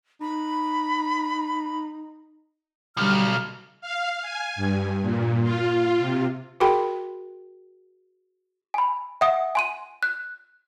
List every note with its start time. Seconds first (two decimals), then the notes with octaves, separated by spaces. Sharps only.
0.21 D#4 B5
2.97 B1 D3 G3 F6
3.81 F5
4.22 G#5
4.56 G2
5.02 A#2
5.42 F4
5.99 C3
6.60 F#4 G#4 A#4 G5 B5 C6
8.74 G#5 B5
9.21 E5 F#5 D#6
9.55 G#5 C6 D#7
10.03 F#6